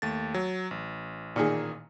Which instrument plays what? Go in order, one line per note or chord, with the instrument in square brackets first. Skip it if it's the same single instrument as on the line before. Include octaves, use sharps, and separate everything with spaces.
[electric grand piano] D#2 A3 A6
F#3
A1
[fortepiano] A#2 D#3 G#4